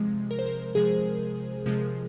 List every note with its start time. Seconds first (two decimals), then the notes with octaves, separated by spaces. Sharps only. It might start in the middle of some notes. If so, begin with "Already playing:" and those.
Already playing: C3 F3 G#3
0.31 A#4
0.39 C5
0.46 A#4
0.75 C3 F3 G#3 G#4
1.66 C3 F3 G#3